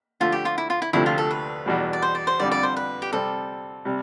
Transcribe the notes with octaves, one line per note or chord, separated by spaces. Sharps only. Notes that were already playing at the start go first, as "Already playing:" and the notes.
D3 F3 A3 F4
G4
F4
E4
F4
E4
D2 C3 F3 A3 C4 E4
F4
A4
B4
E2 B2 G3
D5
C5
D5
C5
F2 D3 G3 D5
D5
C5
B4
G4
C3 G3 C4 A4
C3 G3